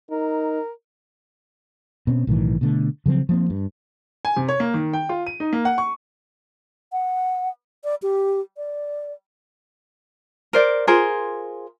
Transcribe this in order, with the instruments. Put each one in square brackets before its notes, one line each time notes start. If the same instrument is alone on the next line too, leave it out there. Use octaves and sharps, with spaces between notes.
[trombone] D#4 [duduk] A#4
[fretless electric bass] B2 C4 C#4
B1 A2 D#3 E3
B2 D3 A3
C#3 F3 F#3 C4
F3 A#3 C4
G2
[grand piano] G#5
C3
C#5
A#3
D#3
G5
F4
D#7
D#4
A#3
F#5
C#6
[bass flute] F#5
D5
G4
D5
[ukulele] A#4 C5 D5
F4 G#4 A#4 C5